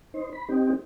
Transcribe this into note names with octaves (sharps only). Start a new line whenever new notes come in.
D#4 C5
B5
C4 D#4 G4